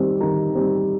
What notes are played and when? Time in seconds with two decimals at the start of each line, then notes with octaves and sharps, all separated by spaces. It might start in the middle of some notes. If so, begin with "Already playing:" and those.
Already playing: D#3 G3 C4
0.21 D#3 A#5
0.55 G3 C4